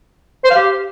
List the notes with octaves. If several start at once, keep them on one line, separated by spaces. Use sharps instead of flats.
C5
F5
G4